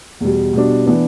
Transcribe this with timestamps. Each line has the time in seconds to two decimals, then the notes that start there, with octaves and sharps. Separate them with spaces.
0.20 E2 B2 G3
0.53 B2 G3 D4
0.86 E3 B3 D4